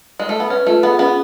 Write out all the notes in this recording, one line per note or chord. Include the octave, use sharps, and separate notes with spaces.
G#3
A3
B3
C#4 B4
A3 F4
B3 G#4
B3 C#4